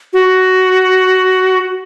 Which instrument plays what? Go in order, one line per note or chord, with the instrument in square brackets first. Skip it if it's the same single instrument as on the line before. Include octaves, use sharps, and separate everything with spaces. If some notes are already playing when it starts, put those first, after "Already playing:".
[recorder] F#4